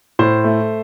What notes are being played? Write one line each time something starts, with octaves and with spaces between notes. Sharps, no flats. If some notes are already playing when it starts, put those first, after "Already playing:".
A2 C5
A3